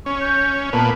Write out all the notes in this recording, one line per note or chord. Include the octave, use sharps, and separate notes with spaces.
C#4 C#6
G6
A#2 B3 A5